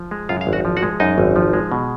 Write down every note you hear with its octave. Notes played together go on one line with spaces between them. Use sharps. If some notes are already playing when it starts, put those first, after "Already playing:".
Already playing: F3
G#3
F#2 F4 F5
F5
G#1
F#4 F#5
F3
F#4 F#5
G#3
F#2 D#4 D#5
G#1
F3
G#3
B2